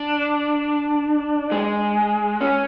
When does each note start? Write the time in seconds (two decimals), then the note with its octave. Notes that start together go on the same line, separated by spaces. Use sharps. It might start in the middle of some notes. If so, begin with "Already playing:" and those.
Already playing: D4
1.52 G#3
2.41 C#4